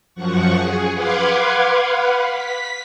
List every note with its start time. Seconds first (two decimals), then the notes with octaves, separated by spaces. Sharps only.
0.15 F#2 F3 F#5 C#6
0.54 G#4
0.93 B4 F5 F#5 C6 D6 G#6
1.79 B4 F5 F#5 B5
2.22 B6